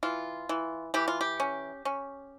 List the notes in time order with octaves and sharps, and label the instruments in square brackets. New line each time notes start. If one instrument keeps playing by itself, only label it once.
[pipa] E3 F4
E3
E3 G4
F4
G4
C#4
C#4